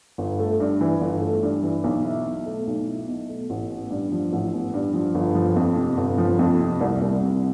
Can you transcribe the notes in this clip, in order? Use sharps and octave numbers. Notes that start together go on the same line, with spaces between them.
G1
A3
G2
E3
G1
A3
G2
E3
B1
E4
B2
A3
B1
E4
B2
A3
A1
B3
G2
F3
A1
B3
G2
F3
G1
F3
F2
C3
G1
F3
F2
C3
C2
C2
C3